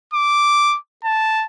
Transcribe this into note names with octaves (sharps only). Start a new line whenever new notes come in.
D6
A5